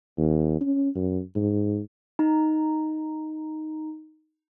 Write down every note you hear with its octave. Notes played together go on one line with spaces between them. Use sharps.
D#2
C#4
F#2
G#2
D#4 A#5